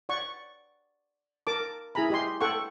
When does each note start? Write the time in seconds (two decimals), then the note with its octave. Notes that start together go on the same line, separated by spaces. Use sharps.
0.09 D5 F#5 C#6
1.47 A#4 A5 D6
1.95 E4 G#4 G#5 A#5 B5
2.10 G4 D#5 C6
2.41 A4 F#5 G5 C#6